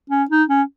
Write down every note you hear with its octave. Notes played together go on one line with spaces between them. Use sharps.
C#4
D#4
C#4